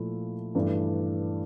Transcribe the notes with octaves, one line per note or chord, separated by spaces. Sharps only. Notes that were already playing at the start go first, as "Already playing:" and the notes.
Already playing: A#2 F3 A3 E4
G2 E3 A3 D4 F4